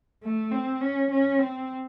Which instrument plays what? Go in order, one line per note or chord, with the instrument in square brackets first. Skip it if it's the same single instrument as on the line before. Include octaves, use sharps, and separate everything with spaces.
[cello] A3
C4
C#4
C#4
C4